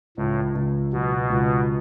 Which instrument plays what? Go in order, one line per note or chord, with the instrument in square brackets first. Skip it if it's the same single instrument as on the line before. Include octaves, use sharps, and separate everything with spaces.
[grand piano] C#2 [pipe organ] A2
[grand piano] C#2
[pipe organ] B2 [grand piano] F#3
[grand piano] C#2